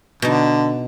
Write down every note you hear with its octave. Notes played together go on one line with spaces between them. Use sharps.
B2 D3 D#4